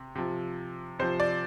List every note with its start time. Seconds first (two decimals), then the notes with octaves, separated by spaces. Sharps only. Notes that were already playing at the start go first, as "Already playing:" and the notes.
Already playing: C3
0.15 C3 F3
0.99 C3 F3 C5
1.20 D5